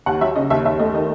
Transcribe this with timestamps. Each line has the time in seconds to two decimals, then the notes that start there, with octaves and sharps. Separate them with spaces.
0.06 D#2 F#5
0.21 F#3 E5
0.36 C#3 D#5
0.50 D#2 E5
0.65 D#2 E5
0.79 A3 D#5
0.94 D#3 D#5